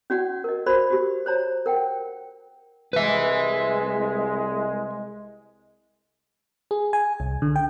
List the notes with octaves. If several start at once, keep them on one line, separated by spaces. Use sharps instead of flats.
C#4 F#4 D5 F#5
A#4 D#5
F#4 A#4 C5 D5 B5 C6
F#4 G4
C5 C#5 A#5
A#4 F#5 G5
C2 G#3 B4 E5
G#4
G#5
C2
D3
G5